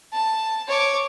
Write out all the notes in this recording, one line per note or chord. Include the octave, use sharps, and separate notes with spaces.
A5
C#5 D6